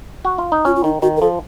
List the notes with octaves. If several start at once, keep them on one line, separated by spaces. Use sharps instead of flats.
F#4
F4
D#4
C#4 F4
F4
D#3 D#4
D#3 F#4
A#4
F3 A4